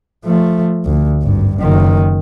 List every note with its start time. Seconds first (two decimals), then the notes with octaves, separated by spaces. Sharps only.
0.25 F3 A3
0.85 D2
1.22 G#1 G2
1.58 F#1 D#3